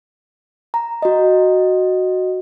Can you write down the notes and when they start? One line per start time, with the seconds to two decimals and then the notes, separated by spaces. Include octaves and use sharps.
0.74 A#5
1.02 F#4 D#5